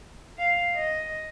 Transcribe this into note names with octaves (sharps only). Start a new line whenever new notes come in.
F5
D#5